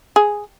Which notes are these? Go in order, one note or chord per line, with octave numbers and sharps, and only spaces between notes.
G#4